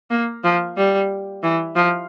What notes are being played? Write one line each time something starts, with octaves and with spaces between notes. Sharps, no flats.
A#3
F3
G3
E3
F3